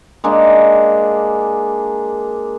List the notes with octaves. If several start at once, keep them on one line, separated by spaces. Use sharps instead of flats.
G#3 A#3 D4